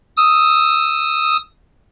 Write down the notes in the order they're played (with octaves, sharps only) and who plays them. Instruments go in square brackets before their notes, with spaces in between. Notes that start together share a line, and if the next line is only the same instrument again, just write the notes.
[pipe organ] D#6 E6